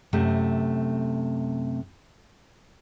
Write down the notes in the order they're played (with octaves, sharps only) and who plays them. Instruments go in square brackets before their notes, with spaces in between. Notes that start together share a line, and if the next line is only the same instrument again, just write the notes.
[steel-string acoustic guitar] F#2 C3 A3